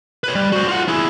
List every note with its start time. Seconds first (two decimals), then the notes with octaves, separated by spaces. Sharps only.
0.24 B4 C#5
0.35 G3
0.53 F#4 C5
0.68 F4 F#5
0.88 E4 G#4